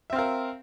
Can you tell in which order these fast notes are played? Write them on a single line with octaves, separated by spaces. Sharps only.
E5 C4 F5 A#4